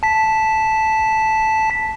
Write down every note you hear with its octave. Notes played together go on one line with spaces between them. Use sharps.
A5 B6